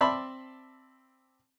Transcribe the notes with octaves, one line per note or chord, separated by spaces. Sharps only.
C4 D5 E5 A5 B5 C6